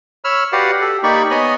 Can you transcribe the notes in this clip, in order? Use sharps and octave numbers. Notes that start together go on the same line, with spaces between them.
C#5 B5 E6 F6
F#4 G4 B4 D5 F5 F#5
G4 A4
A#3 D#4 G4 D5 B5 C#6
B3 C#5 D#5 G#5 B5